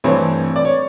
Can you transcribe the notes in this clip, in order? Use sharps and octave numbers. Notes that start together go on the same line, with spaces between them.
G2 E3 A3 C4 C#5
D5
C#5